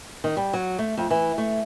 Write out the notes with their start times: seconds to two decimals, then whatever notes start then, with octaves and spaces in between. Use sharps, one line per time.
0.24 D#3
0.37 G3
0.53 F#3
0.79 A3
0.98 F2
1.11 E3
1.38 A3